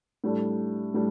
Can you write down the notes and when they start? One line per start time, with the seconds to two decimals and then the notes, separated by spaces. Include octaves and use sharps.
0.24 A2 G3 D4 A4
0.94 A2 G3 D4